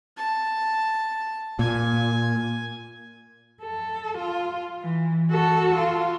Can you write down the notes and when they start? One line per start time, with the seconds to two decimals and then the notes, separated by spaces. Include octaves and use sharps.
0.17 A5
1.59 A#2 G#5
3.62 A4
4.18 F4
4.82 E3
5.31 F#4 A4
5.76 F4